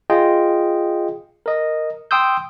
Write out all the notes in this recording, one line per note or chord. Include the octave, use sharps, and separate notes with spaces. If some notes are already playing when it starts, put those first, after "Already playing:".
F4 G#4 D#5 G5
A#4 D#5
G5 C6 D#6 E6 G6